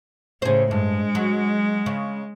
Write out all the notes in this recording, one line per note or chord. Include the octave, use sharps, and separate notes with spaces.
A2 C#3 G#4 C5
G2 G#3
F#3
C#3